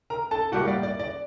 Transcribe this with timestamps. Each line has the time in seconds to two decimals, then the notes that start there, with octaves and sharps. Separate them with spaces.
0.10 A#4 A#5
0.31 A4 A5
0.52 A2 G3 A#3 F#4 F#5
0.68 D5
0.83 D5
1.00 D5